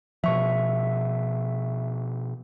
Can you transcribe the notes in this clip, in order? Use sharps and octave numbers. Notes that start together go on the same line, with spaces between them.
B2 F3 E5 C#6